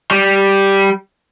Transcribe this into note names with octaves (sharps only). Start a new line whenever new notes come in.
G3